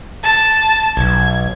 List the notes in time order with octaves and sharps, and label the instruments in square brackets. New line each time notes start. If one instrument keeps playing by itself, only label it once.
[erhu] A5
[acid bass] B1 [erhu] G#6